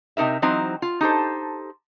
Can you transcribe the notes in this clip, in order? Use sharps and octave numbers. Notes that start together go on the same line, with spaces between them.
C3 D#4 A#4 E5
E3 F#3 C4 D#4 C5
F4
D#4 G4 A4 C5